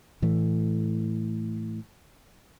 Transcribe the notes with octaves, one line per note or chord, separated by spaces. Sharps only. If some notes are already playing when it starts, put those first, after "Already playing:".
A2 E3 A3